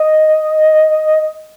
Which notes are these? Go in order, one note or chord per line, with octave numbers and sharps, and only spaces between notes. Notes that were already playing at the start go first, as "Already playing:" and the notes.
Already playing: D#5